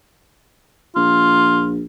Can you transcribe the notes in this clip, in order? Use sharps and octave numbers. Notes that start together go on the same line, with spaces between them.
A#1 F4